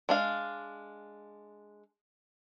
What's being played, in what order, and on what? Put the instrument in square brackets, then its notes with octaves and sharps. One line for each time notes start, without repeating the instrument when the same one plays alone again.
[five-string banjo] G#3 D4 F5